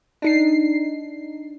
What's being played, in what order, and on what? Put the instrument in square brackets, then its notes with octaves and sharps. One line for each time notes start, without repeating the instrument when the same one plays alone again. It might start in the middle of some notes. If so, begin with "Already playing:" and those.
[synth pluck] D4 D#4 C7